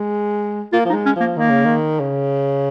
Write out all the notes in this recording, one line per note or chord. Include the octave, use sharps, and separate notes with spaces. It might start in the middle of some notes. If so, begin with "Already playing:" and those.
Already playing: G#3
A#3 F4
F3
D#4
G#3
C#4
F3 A#3
D#3 A#3
C#3
D#3
C#3